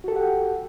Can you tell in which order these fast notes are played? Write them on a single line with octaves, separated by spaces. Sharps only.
F#4 A4 G4 F#5 G5